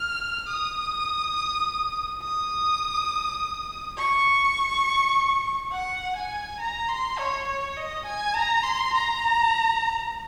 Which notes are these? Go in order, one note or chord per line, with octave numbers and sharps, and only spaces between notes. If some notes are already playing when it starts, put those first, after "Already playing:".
Already playing: F6
D#6
D#6
C#6
F#5
G#5
A#5
C6
C#5
C#5
D#5
G#5
A#5
C6
A#5